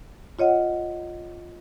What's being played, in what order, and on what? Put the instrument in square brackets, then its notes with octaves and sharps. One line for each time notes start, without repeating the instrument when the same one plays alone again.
[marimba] F4 C#5 D#5 F#5